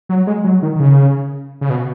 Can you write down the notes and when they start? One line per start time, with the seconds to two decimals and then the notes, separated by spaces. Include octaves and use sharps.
0.09 F#3
0.27 G#3
0.44 F#3
0.62 D#3
0.76 D#3
0.80 C#3
1.61 C#3
1.70 B2